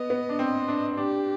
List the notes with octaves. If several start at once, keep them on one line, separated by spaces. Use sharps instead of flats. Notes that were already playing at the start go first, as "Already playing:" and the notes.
Already playing: B3 D#5
B3
D4
C4
D4
D4 G4